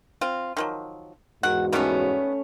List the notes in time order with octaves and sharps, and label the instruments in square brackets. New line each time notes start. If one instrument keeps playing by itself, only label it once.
[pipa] C4 F4
D#3 F3 F#3
[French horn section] E2 G#2 F#4 [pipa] D#3 F#5
[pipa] D#3 G3 B3 [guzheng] A3 C#4